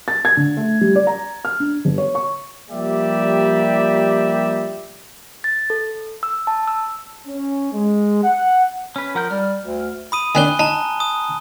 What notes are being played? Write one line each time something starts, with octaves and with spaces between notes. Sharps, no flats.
A6
G#6
D3
A3
G3
D5
A#5
F6
D4
G1
C#5
C#6
F3 G3 A#3 G4 D5 E5
A6
A4
E6
A5
E6
C#4
G#3
F#5
C#4 B4
F3 A#4 F#5 G6
G3 F6
D2
B5 D#6 D#7
D#3 C4 D4 G#5 F#6 G7
D#4 A5 A#5
D#6